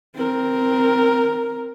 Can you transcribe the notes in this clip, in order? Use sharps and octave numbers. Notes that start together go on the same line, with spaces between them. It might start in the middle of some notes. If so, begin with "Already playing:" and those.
C4 A#4